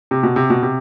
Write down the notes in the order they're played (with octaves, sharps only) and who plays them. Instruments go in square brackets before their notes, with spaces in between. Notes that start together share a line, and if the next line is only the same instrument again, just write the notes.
[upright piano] C3
B2
C3
B2
C3